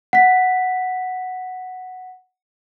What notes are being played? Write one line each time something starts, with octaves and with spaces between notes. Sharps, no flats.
F#5 B6